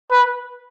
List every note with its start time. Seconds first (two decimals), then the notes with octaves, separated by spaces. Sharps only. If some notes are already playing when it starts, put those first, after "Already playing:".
0.11 B4